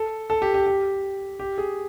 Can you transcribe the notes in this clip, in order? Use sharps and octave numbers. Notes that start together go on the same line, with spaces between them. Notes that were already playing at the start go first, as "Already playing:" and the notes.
Already playing: A4
A4
G4
G4
G4
G4
G#4